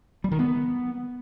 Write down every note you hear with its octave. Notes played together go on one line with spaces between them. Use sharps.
G3
D#3
B3